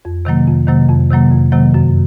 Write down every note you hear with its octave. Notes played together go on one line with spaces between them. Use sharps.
F2
C3 D#3 F#3 A#3
F2
C3 D#3 F#3 A#3
F2
C3 D#3 F#3 A#3
F2
C3 D#3 F#3 A#3
F#2